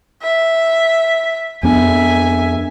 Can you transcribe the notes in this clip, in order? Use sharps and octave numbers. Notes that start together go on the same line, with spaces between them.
E5
F2 B3 D4 E5 G#5